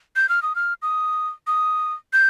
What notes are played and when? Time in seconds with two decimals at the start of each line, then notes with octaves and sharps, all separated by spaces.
0.16 G6
0.29 F6
0.43 D#6
0.56 F6
0.82 D#6
1.47 D#6
2.13 G6